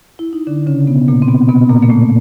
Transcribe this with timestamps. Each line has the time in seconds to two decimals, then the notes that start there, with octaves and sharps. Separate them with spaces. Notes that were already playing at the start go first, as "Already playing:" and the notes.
0.19 E4
0.33 D#4
0.47 D3 D4
0.67 C#3 C#4
0.87 B2 B3
1.08 A#2 A#3
1.22 C4
1.28 B2 B3
1.49 B2 B3
1.69 A#2 A#3
1.82 A#3
1.89 A2 A3